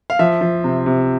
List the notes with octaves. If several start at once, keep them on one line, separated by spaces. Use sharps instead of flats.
F5
F3 E5
F3
C3
C3